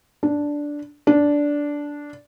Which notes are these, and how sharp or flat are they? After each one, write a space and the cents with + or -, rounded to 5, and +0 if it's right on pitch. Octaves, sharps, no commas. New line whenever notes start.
D4 -5
D4 -10